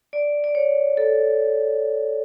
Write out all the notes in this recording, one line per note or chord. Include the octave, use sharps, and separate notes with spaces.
D5
D5
C#5
A4